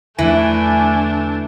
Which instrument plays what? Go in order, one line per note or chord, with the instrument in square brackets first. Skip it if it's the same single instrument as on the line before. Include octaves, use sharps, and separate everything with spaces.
[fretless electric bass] E2 D3 F3 [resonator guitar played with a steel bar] E3 [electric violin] A3 D4 [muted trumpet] G#5